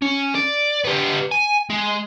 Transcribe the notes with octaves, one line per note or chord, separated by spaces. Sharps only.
C#4
D5
B3 G4
G#5
G#3